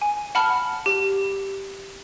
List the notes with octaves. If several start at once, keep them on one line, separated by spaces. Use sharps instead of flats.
G#5
F#5 A5 B5 F6
G4